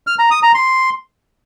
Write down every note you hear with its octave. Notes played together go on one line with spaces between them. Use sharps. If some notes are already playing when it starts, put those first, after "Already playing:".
F6
A#5
D#6
A#5
C6